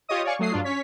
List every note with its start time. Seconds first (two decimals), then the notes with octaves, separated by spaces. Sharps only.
0.09 F4 G4 C#5 D#5 D#6
0.25 C#5 D5 F5 G#5 C#6
0.39 F#3 A3 D#6 C7
0.52 G2 F#3 D4 F4
0.64 C#4 C#5 B6